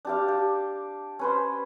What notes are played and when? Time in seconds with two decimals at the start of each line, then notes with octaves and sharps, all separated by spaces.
0.05 D4 G4 F5
0.28 G4
1.19 C#4 B4 C5